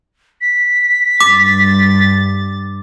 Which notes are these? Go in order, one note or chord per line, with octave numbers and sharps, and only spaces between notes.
B6
G2 D6 A6